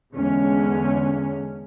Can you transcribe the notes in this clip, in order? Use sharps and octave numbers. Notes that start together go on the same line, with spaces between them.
E2 D3 G#3 C#4